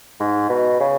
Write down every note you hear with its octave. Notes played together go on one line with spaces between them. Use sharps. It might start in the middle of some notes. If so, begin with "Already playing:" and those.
G#2
B2
C#3